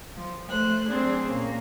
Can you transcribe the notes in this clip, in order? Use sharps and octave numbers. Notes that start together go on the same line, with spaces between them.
F3
A3 C5 F#6
F#3 A3 C4 D4 G#4
A#2 A#3 C#4